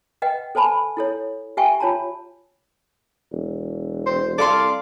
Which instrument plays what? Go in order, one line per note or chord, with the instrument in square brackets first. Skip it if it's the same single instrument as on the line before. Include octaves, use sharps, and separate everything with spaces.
[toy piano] B4 D#5 F#5 G5
A4 C5 G#5 A5 B5
E4 A4 C#5
G4 E5 G5 G#5 C#6
F4 C#5 A5 A#5
[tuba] E1
[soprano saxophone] C5
[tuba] C2 [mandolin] A4 F5 C6 [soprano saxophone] D5